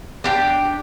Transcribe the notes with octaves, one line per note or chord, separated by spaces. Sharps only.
D4 G4 G5